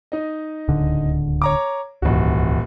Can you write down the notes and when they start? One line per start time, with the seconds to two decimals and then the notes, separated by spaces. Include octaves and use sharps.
0.12 D#4 D#5
0.68 D1 C#2 D3
1.42 C#5 A#5 D6
2.02 D#1 C#2 G#2 E3 F#4